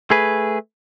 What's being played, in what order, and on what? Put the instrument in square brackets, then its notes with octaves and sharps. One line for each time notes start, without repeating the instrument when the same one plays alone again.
[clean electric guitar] A3 G#4 B4